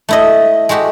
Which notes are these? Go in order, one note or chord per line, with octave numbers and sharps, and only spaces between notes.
A3 E4 D#5
G#3 A3 F#4 G4